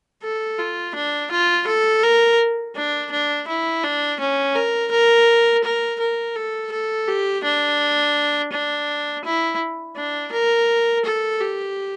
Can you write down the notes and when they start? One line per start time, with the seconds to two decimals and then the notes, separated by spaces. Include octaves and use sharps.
0.23 A4
0.59 F4
0.95 D4
1.31 F4
1.67 A4
2.03 A#4
2.75 D4
3.11 D4
3.48 E4
3.84 D4
4.20 C#4
4.55 A#4
4.91 A#4
5.64 A#4
6.00 A#4
6.36 A4
6.72 A4
7.08 G4
7.44 D4
8.52 D4
9.24 E4
9.96 D4
10.33 A#4
11.05 A4
11.41 G4